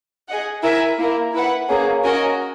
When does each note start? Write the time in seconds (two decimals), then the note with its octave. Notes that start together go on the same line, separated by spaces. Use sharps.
0.28 G#4 D#5 F#5
0.63 E4 A#4 E5 G#5
0.98 A#3 E4 A#4
1.33 E4 B4 F#5
1.69 A#3 C#4 G#4
2.04 C#4 F#4 A#4 D#5 G#5